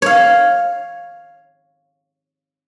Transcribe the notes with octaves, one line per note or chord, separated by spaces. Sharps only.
C#5 F5